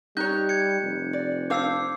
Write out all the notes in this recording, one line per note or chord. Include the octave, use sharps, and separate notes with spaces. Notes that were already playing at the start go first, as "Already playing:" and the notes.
G3 D#4 C#5 F#6 G6
G#6 C#7
F1
D5
D4 C5 F5 D6 E6 C7